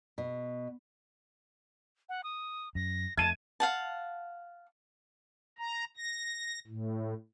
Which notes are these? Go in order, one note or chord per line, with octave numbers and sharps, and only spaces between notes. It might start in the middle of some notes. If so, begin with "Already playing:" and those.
B2
F#5
D#6
F#2 A#6
F2 G#3 A3 A5 G#6 D#7
F5 F#5 A5
A#5
A#6
A2